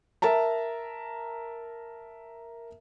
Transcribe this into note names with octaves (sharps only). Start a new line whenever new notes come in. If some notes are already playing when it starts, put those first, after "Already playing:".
A#4 E5 A5 A#5